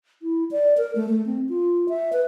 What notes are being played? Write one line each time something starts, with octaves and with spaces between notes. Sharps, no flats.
E4
D5
A#4
A3
A3
C4
F4
E5
B4